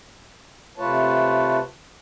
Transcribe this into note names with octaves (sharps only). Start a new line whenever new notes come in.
C3 A3 F4 B4 C#5 A5